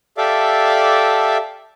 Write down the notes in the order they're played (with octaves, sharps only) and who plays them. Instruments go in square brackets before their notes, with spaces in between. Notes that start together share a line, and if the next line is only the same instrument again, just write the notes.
[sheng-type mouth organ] G4 A4 D5 E5 F5 D6